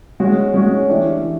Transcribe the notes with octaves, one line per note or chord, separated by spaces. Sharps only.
G#3 C#4 F#4
G#3 C#4 F#4
E3 A3 D4 G4
E3